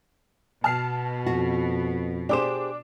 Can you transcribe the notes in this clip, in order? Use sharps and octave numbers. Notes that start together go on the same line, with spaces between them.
B2 A5 F6 C7
F2 F#4
D4 G4 G#4 C5 D6 E7